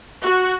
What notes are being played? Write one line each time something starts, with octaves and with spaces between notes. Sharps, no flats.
F#4